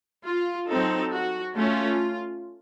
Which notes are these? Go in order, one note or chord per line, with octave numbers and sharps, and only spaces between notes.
F4
F#3 C4 D#4 A4
F#4
A3 C#4 F4